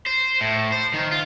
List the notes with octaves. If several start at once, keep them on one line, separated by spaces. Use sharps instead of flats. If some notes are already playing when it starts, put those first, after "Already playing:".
C5
A2
C5
D#3
F4